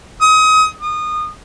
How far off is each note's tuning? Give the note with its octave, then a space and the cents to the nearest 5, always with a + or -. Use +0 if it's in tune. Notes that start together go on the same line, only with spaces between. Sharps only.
D#6 +30
D#6 -25